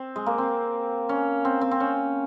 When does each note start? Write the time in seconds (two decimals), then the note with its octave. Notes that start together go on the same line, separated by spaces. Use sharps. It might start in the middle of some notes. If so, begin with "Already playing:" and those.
Already playing: C4
0.16 G#3
0.26 A#3
0.38 C4
1.09 C#4
1.45 C4
1.61 C4
1.71 C4
1.80 C#4